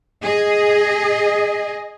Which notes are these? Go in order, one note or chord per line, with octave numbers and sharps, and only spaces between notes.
G#4 D#5